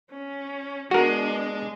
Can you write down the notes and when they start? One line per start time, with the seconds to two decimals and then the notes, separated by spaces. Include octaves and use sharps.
0.11 C#4
0.91 G#3 B3 D4 F#4 A#4